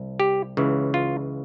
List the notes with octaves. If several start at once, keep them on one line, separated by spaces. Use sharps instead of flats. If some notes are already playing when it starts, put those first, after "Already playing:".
Already playing: C2
G4
C#2 C#3 E3
F4